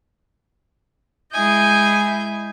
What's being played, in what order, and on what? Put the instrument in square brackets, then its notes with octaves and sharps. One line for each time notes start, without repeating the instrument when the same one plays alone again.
[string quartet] G#3 E4 D#5 G#5 G6